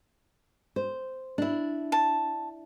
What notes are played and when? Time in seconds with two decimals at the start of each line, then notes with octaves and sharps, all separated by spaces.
0.76 C5
1.38 D4 E4
1.92 A5